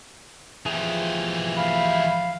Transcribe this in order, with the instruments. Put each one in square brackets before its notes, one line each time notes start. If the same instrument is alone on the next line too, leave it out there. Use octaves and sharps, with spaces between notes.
[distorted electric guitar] E3 G4 [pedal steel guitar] F3 G#4
[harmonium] F5 [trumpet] B5